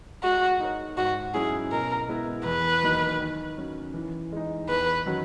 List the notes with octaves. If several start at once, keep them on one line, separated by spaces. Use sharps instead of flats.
G#3 F#4
D#4 A#4 C#5
G#2 F#4
F#3 C#4 E4 G#4
B2 A#4
G#3 B3 E4 A#4
E2 B4
D#3 F#3 A#3 D#4
D#3
F#3 C#4
E3
G#3 D#4
E2 B4
D#3 F#3 C#4 F#4